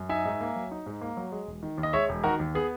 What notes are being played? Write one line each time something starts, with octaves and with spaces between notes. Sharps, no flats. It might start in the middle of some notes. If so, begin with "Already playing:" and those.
Already playing: F#2
D#4 E5 G#5
G#2
A#3
F#3
D#4
G#2
A#3
F#3
G#3
E1
D#3
D#2
D#5
G#3 C#5 E5
E1
D#3 F#4 A#4
D#2
B3 G#4